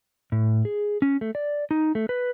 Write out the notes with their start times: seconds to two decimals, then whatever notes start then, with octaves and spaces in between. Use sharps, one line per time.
0.32 A2
0.65 G#4
1.02 C#4
1.21 A3
1.35 D5
1.71 D#4
1.95 A3
2.09 B4